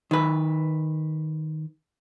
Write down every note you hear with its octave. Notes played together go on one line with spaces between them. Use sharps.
D#3 B4